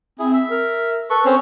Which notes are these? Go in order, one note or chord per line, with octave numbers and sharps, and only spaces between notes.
C4 E4 G#4
E5
A#4
A4 B4 C#6
C4 C#4 C5